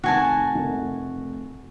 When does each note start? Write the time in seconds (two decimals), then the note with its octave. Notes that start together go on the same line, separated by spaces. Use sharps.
0.04 F1 D#3 F#4 G#5 A5
0.55 F1 A3 A#4